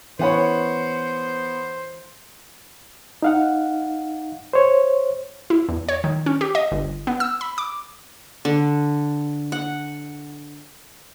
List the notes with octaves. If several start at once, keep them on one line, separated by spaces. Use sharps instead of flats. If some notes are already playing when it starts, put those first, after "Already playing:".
E3 B3 C5 C#5 F#5 B5
D#4 F5 F#5
C5 C#5
E4
E2
C#5
D#3
C#4
G4
D#5
G1
B3
E6
B5
D6
D3
F#5